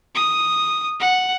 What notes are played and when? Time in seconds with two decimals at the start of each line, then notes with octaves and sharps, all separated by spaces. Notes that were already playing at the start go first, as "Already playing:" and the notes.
0.15 D#6
1.00 F#5